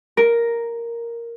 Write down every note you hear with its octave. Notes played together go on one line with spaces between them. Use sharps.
A#4